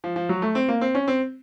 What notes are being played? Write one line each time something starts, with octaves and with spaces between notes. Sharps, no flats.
F3
F3
F#3
A3
C4
A#3
C4
C#4
C4